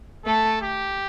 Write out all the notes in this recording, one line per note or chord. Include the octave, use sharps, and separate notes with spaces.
A3 A4
G4